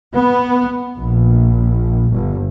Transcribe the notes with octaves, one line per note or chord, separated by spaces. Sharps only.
B3
A#1
G1